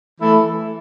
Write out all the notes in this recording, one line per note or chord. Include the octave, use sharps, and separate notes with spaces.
E3 A3 E4 A4